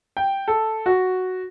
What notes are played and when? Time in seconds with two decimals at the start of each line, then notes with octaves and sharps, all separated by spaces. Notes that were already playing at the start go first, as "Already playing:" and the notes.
0.17 G5
0.48 A4
0.86 F#4